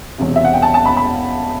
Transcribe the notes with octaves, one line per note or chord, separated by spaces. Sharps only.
E1 E2 C3
E5
F#5
G5
A5
A5
B5
B5